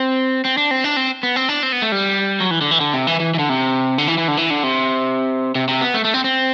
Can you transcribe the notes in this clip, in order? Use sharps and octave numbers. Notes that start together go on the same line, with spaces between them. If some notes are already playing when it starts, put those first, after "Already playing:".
Already playing: C4
C4
D4
C4
D4
C4
B3
C4
D4
C4
B3
A3
G3
F#3
E3
D3
E3
D3
C3
E3
E3
E3
D3
C3
D3
E3
E3
D3
E3
D3
C3
C3
C3
B3
A3
A3
C4
C4